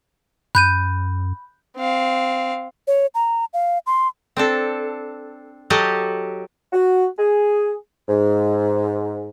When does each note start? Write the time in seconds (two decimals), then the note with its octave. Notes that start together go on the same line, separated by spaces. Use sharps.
0.55 F#2 B5 F#6 G6 D#7
1.77 C4 F5
2.87 C#5
3.15 A#5
3.54 F5
3.87 C6
4.37 C4 D4 A4
5.70 F#3 F#4 G4 A4 D#5
6.72 F#4
7.18 G#4
8.08 G#2